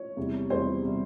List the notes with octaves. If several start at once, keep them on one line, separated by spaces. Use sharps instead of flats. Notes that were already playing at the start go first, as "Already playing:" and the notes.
Already playing: C#5
E2 C3 G3
E2 C3 G3 C5
C3 G3